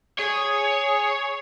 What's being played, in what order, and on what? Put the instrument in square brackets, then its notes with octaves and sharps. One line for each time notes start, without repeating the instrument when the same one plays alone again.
[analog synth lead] G#4 [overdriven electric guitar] C#5